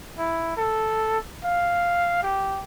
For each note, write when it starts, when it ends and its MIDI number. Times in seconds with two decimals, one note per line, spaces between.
0.18 0.53 64
0.57 1.18 69
1.44 2.21 77
2.23 2.62 67